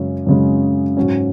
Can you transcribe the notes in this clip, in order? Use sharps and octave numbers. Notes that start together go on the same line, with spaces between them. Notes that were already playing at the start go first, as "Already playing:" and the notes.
Already playing: F#2 C#3 G#3 C#4
F#2 C#3 G#3 C#4
G#2 F#3 C#4